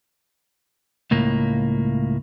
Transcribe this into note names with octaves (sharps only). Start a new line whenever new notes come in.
C#2 A2 A#3